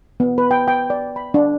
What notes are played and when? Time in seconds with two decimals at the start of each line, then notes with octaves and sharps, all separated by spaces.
0.20 B3
0.38 B4
0.51 G5
0.68 G5
0.90 D5
1.16 B5
1.34 D4